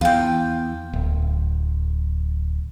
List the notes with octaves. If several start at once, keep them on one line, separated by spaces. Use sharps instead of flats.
E2 F4 G5
D1